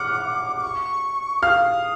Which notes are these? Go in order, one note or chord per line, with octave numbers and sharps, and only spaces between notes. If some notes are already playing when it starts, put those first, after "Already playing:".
Already playing: F#5 D6 F6 F#6
D6
C#6
D6
F5 D#6 F6